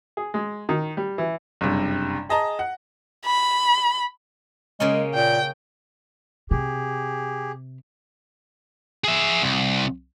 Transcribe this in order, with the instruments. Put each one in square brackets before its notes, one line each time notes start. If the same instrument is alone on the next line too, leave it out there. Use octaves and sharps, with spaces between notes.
[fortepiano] G#4
G#3
D#3
G3
E3
[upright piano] F#1 G2 C3
G#4 D#5 A5 A#5
F#5
[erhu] B5
[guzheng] C#3 A#3 C#4 [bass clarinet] G#3
[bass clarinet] A#2 [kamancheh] G5
[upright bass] C3 [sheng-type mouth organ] G4 G#4
[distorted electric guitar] G#4 E5
C2